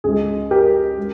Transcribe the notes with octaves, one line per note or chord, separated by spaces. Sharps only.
C#2 C#3 G#3 G#4
G4 A#4
G#3